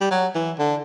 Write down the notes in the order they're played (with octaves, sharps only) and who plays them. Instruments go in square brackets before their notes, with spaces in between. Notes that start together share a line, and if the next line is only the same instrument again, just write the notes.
[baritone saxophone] G3
F#3
E3
D3